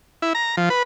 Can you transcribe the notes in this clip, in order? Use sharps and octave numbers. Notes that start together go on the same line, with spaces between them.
E4
A#5
F3
B4